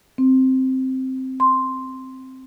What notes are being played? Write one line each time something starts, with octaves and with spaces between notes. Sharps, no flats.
C4
C6